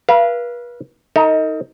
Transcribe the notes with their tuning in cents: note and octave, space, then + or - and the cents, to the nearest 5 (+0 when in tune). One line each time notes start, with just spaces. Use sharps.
B4 -40 F5 -30
D#4 +20 A#4 -45